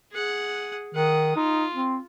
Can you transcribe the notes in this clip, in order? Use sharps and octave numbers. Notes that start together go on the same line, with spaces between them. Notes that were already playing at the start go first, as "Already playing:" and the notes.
G#4 F#5
D#3 F#5 D#6
D#4 F4
C4